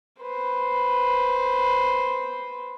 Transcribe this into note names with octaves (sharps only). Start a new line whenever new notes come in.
B4 C5